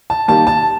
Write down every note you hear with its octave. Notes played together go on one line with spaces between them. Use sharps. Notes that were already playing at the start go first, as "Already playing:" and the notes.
A5
D#3 G3 A#3 A5
A5